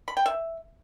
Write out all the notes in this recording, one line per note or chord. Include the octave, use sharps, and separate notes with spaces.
B5
G5
E5